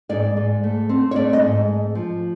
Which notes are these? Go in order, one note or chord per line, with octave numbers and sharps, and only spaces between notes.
G#2 D5
G#2
A3
C4
C#5
A3 D5
D#5
G#2
A3
F3